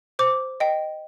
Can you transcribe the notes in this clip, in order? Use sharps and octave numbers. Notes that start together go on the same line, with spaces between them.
C5 D6
D#5 G5